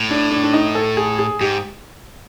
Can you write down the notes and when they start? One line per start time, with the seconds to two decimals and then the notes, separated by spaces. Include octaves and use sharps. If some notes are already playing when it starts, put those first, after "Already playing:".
Already playing: A2
0.10 D4
0.31 D4
0.43 D4
0.53 D#4
0.75 A4
0.97 G#4
1.19 G#4
1.41 G#2 G4